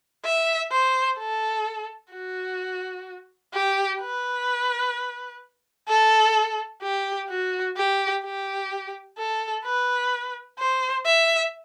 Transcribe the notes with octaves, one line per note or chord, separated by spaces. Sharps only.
E5
C5
A4
F#4
G4
B4
A4
G4
F#4
G4
G4
A4
B4
C5
E5